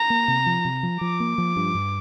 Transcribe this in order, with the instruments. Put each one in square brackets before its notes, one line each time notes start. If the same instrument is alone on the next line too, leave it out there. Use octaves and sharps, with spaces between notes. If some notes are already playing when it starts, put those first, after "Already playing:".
Already playing: [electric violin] A#5
[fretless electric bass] A#3
C3
F3
C3
F3
[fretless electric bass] F3 [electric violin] D6
[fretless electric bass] A#3
F3
G2
G2